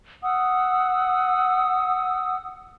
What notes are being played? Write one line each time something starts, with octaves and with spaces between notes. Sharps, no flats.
F#5 D#6 E6